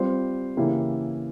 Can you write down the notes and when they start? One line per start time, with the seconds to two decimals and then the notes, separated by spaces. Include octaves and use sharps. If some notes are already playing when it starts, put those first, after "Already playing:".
Already playing: G3 C4 F4 C5
0.57 C#3 E3 A#3 E4 G4